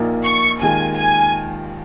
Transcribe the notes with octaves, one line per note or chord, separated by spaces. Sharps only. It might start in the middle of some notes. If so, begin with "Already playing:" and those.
Already playing: A#1 A#2 A#3 D#4
C#6
D#2 D#3 G#3 F4 G#5
G#5